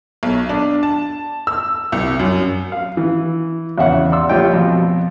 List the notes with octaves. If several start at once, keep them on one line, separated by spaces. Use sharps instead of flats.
B1
D4
A5
E6
C2
F#2
F5
E3
E2 C#3 E5 F#5
D5 C6 E6
A#1 F4 G4 C#5 D#5 G5
F2 B2